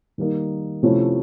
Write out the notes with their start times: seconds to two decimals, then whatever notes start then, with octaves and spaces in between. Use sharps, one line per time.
0.18 D#3 G3 A#3 D#4
0.83 C3 F3 A3 C#4 E4